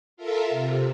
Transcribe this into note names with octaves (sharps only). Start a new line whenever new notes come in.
F4 A4 A#4 E5
C3